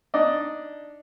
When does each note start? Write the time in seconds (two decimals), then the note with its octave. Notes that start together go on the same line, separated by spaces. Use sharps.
0.14 D4 D#4 D5 D#5